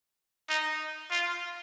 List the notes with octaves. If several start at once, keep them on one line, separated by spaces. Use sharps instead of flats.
D#4
F4